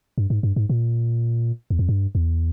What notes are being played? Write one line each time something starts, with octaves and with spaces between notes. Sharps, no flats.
G2
G#2
G2
G#2
A#2
E2
F2
G2
E2